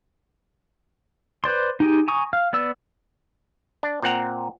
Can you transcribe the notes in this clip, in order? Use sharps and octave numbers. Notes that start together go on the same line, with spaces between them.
B4 C5 D5 C6
D#4 G4 G#4
G#5 A#5 C#6 D#6
F5
B3 D5 E6
D4
A#2 C4 F#5 A#5